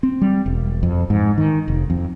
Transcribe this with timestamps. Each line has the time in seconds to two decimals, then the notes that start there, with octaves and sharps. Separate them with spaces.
0.03 C4
0.21 G3
0.46 E1
0.83 F2
1.10 G#2
1.38 D#3
1.68 F1
1.90 F2